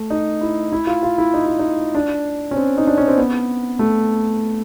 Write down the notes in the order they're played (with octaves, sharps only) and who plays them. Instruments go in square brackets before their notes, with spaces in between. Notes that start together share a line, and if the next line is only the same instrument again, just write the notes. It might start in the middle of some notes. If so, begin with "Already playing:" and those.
Already playing: [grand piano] A3
D#4
E4
E4
F4
F4
E4
D#4
E4
D#4
D4
C#4
C4
D#4
D4
C#4
C4
B3
A3